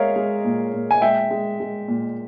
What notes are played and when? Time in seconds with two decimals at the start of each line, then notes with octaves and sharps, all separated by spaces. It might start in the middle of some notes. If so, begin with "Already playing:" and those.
Already playing: G#3 G#4 A#4 C#5 E5 F5
0.16 G#3
0.44 A#2
0.74 A#2
0.91 G#5
1.01 G#3 E5 G5
1.31 G#3
1.60 G#3
1.88 A#2